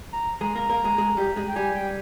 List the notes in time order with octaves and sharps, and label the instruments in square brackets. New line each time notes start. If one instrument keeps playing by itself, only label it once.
[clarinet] A#5
[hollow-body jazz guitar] G#3 G#4 [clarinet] A#5
[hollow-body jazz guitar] A#3 A#4
A#3 A#4
G#3 G#4
G#3 G#4
G3 G4
G#3 G#4
[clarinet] G5
[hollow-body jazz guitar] G3 G4 [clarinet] G#5
[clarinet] G5